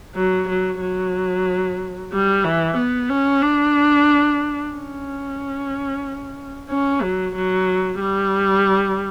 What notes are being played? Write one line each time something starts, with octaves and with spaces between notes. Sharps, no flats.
F#3
F#3
F#3
G3
E3
B3
C#4
D4
C#4
C#4
F#3
F#3
G3